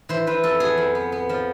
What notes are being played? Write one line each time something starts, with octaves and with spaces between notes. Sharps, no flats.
E3 C5
E3 B4
F2 A4
B3 G#4
F2
B3
B3
F3